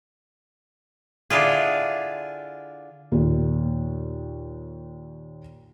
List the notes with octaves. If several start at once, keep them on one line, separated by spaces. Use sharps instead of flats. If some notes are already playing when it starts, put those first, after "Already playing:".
D3 D4 E4 F4 G#4
D#2 A#2